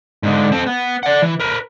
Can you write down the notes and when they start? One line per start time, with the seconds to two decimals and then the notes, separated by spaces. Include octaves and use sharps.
0.23 G#2 D3
0.52 C4 A4
0.66 B3
1.03 D5 F#5
1.22 E3
1.40 A#4 B4